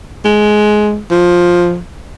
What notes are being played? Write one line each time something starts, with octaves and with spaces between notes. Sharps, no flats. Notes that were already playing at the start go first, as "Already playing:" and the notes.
G#3
F3